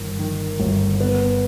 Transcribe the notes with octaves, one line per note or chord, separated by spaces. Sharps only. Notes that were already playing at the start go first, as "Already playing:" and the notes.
Already playing: G1 D#3
D#3
G1
B3